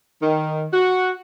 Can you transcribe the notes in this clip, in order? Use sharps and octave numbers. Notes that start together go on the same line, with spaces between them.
D#3
F#4